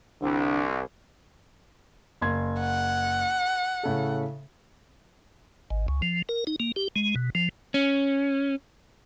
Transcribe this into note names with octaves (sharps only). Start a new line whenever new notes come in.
C2 D3
F#1 C6 G#6
F#5
A2 C#3 A4
G#1
C#2
F3
A#4
D#4
A#3
G4
G#3
B2
F3
C#4